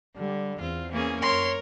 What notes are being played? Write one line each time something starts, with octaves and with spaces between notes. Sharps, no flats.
D3 G3
E2 C4 F4
E3 A#3 C#4 G#4
F#2 A#4 C#5 C6